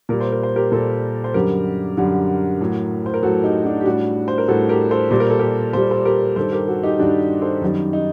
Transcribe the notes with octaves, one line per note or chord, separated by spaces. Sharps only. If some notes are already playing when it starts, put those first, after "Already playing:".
A#2 G3 A#4
C5
A#4
C5
G4 A#4
A#2 G3 A4 C5
C5
F#2 D3 G3 G4 A#4
F#2 D3 G3
A2 F#3
C5
A#4
A2 F#3 F#4 A4
D#4 G4
D4 F#4
G4
A2 G3 D4 F#4
C5
A#4
A2 G3 F#4 A4
G4 A#4
A4 C5
A#2 G3 C5
A#4
A4
G4 A#4
A#2 G3 C5
A4 C5
G4 A#4
G2 D#3 G3 A4 C5
G4 A#4
F#4 A4
D#4 G4
G2 D#3 G3 D4 F#4
A4 C5
F#2 D#3 G3
D#4